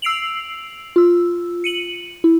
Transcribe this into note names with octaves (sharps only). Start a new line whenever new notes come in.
E6 C7 D7 F7 F#7
F4 E6
C#7 D#7 F#7
E4